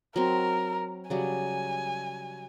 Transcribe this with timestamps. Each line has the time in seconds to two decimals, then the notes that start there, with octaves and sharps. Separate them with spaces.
0.16 F#3 C4 A#4
1.10 C#3 F#3 G3 G#5